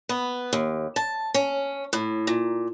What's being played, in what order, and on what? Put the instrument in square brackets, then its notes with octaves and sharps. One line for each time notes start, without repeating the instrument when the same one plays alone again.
[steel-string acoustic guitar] B3
D#2
A5
C#4
A2
A#2